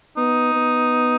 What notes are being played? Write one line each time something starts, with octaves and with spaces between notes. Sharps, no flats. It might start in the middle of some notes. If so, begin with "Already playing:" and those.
B3 D#4
B3